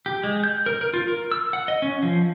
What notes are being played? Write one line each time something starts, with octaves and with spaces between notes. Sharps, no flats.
G4
G#3
G6
A#4
A#4
F4
A#4
E6
F#5
D#5
C#4
F3